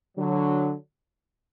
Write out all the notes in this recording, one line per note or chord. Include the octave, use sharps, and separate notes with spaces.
D3 F#3